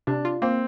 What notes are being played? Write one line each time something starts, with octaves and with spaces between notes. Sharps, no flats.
C3 D4
F4
A#3 C4